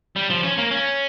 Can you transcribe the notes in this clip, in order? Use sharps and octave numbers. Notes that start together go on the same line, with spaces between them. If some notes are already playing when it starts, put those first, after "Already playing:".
G3
F3
C#4
A#3
C#4